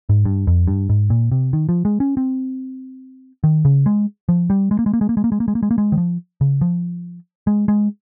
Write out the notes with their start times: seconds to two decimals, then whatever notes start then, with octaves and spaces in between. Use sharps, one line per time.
0.09 G#2
0.25 G2
0.47 F2
0.67 G2
0.89 G#2
1.10 A#2
1.31 C3
1.53 D#3
1.69 F3
1.85 G#3
2.00 C#4
2.17 C4
3.44 D#3
3.65 C#3
3.86 G#3
4.29 F3
4.50 G3
4.71 G#3
4.79 A#3
4.86 G#3
4.93 A#3
5.01 G#3
5.09 A#3
5.17 G#3
5.24 A#3
5.32 G#3
5.40 A#3
5.48 G#3
5.55 A#3
5.63 G#3
5.71 A#3
5.78 G#3
5.92 D#3
5.98 F3
6.41 C#3
6.61 F3
7.47 G#3
7.68 G#3